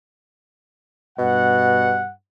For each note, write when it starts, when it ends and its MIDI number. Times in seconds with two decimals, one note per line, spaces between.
1.19 2.11 43
1.19 2.01 47
1.19 2.11 78